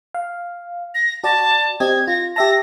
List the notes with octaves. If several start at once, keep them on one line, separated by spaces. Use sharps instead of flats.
F5
A#6
F#4 D5 A5
C4 G4 D#5 G#6
F4 A#6
G4 E5 A5 A#6